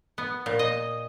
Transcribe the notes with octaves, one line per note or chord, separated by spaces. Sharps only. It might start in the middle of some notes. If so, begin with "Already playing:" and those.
B3
A#2
D#5